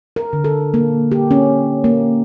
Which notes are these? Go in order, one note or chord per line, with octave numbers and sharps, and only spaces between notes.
A#4
D3
A4
A#3
G4
C#4
A#3